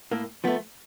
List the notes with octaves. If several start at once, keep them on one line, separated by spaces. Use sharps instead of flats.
A2 A#3
F3 A3 B3